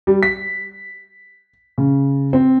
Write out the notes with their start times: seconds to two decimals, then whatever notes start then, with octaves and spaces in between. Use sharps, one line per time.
0.07 G3
0.23 B6
1.78 C#3
2.33 C4